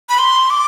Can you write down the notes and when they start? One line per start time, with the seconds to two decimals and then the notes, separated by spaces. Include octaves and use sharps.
0.09 B5
0.18 C6
0.50 D6